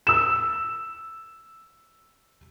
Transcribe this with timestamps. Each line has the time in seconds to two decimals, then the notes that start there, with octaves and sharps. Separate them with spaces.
0.07 E6 E7